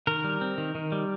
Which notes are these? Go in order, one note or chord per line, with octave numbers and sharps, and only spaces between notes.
D#3 A#4
G3
C4
D#3
D#3
G3